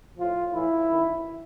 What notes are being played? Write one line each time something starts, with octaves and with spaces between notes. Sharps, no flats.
A2 F3 F4
A2 E3 E4
F#2 D#3